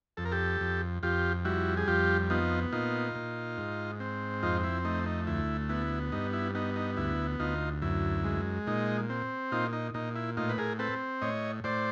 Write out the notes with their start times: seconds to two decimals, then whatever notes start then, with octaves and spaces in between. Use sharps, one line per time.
0.17 F2 A4
0.25 A#4
0.32 G4 A4
0.61 F2
1.03 F2 F4 G4
1.45 G3 E4 F#4
1.77 G#4
1.88 F2 F4 G4
2.30 B3 D#4 F4
2.72 A#2 D#4 F4
3.15 A#2
3.58 G#2
4.00 C4
4.43 F2 D#4 F4
4.64 E4
4.85 A3 D#4
5.06 D#4
5.27 D2 E4
5.69 B3 E4
6.12 G2 D#4
6.33 E4
6.55 B3 D#4
6.76 D#4
6.97 D2 E4
7.40 D2 D#4 F4
7.82 F#2 E4
8.24 G#3
8.67 A#2 D#4
9.10 C4
9.52 A#2 D#4 F4
9.73 D#4
9.94 A#2 D#4
10.16 E4
10.37 A2 D#4 F4
10.49 B4
10.58 G#4 A#4
10.79 C4 A4 B4
11.22 A2 C#5 D#5
11.64 A2 C5 D5